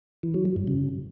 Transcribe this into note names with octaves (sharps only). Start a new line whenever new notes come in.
E3
F#3
F#3
G2
C#3